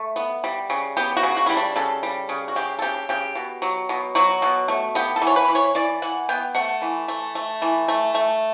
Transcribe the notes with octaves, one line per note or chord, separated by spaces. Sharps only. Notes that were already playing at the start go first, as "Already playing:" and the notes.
Already playing: A3
B3
G3
C#3
B3 G4
F#4
C#3
F#4
G3 E4
D4
C#3 A4
G3
C#3
F#4
C#3 G4
A4
C#3 G4
C#3 G4
B2
F#3
B2
F#3 F#4
B2
A3
B3 G4
A4
E3
C#5
B4
E3
C#5
E3 D5
E3 F#5
B3 G5
A3 F#5
E3
A3
A3
E3
A3
A3